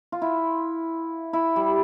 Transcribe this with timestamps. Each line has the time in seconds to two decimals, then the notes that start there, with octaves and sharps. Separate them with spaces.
0.12 F4
0.22 E4
1.33 E4
1.56 G3